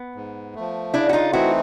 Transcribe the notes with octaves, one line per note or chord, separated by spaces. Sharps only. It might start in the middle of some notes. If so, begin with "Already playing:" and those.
Already playing: B3
G#2
F3 A3
C#3 D4 E4
F#4
D#4 F4
E3 A3 C4 D#4 E4 F#4